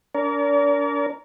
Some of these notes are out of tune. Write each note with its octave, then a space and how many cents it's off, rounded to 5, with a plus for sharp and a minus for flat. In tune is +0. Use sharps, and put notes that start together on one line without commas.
D4 -35 A#4 +0 D5 -40